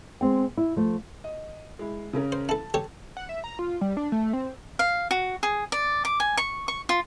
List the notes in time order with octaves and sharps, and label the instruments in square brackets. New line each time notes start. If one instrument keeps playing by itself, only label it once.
[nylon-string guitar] G#3 C4 G5
E4
F3 A3
[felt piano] D#5
G#3 E4
C#3 C#4 A#4
[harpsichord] C5
[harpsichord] E4 A4 [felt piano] A5
[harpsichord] G4 A4 C#5
[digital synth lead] F#5
E5
A#5
F4
G3
D4
A3
C4
[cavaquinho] F5
F#4
G#4
D5
D6
G#5
C#6
C#6
F4